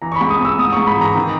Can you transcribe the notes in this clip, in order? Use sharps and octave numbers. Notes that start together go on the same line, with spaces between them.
E3 A#5
C#6
B5
C#2
D#6
C#2 E6
G#2 D#6
G#2 C#6
B5
E3 A#5
D#3